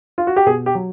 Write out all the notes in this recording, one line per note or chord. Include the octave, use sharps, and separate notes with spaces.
F4
F#4
G4
B2 G#4
G4
F#3